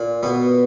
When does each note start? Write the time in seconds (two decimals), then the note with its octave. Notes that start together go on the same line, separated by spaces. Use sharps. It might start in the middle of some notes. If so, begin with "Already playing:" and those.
Already playing: A#2
0.23 B2 B3